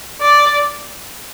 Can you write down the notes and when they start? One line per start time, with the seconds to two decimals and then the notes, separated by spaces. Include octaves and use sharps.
0.21 D5